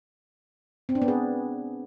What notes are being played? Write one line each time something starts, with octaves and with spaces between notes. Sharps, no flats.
C4
D4
B3
G#4